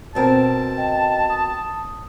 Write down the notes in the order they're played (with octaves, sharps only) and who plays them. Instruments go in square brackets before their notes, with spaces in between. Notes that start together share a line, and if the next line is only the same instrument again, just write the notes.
[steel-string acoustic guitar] B2 C4 A#4 [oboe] A5
[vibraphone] D#5 G5
D#6